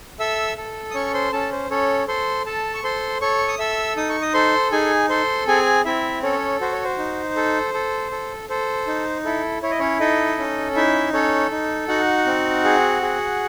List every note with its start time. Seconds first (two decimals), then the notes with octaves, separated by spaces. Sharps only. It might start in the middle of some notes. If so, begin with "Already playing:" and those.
0.19 A4 E5 E6
0.57 A4
0.91 D#6
0.95 C#4 C#5 C#6
1.14 C5 C6
1.33 C#4 A4 A5
1.52 C5
1.70 C#4 A4 C#5
2.08 A4 C5 C6
2.46 A4 A5
2.74 C#6
2.84 A4 C5 C6
3.21 A4 C#5 C#6
3.48 D#6
3.59 A4 E5 E6
3.97 D#4 D#6
4.10 C#6
4.22 D#5 D#6
4.34 A4 C5 C6
4.72 D#4 G#4 G#5
5.09 A4 C5 C6
5.48 C4 G#4 G#5
5.85 C4 E4 E5
6.23 C#4 A4 C#5
6.61 F#4 C5
6.73 C#5
6.84 C5
6.98 D#4
7.36 A4
7.74 A4
8.12 A4
8.49 A4 C5
8.87 D#4
9.25 E4 A4
9.62 E4 C#5
9.71 D#5
9.79 C#4 C#5
10.00 D#4 A4 D#5
10.38 C#4
10.76 D#4 E4 E5
11.13 C#4 A4 C#5
11.51 D#4
11.88 D#4 F#4 F#5
12.26 C4
12.64 G#4
13.02 G#4